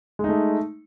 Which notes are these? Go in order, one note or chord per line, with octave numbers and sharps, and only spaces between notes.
G#3 A3 D#4